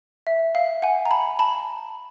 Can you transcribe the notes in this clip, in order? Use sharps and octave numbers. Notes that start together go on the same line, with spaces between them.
E5
F5
F#5 G#5
A#5
A5 B5
A5 B5